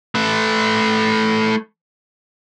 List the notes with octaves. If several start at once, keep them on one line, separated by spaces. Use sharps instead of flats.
A3 B4